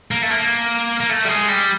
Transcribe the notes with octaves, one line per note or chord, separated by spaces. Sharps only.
A#3
A3
A#3
A#3
A3
G3
G#3
G3